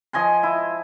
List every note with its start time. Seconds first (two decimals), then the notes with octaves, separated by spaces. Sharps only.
0.13 F3 D#5 G#5 C6
0.43 E4